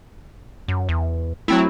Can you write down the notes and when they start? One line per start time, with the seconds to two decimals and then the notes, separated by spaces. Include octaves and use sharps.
0.68 F#2
0.89 E2
1.48 F#3 A3 C4 E4